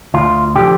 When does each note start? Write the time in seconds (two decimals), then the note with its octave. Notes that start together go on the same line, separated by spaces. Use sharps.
0.14 D2 F4
0.55 D3 F3 G4